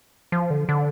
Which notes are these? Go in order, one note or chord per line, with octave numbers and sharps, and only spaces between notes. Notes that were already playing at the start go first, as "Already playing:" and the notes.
F3
D3
D3